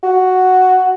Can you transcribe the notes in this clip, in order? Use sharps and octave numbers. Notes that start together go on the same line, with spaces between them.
F#4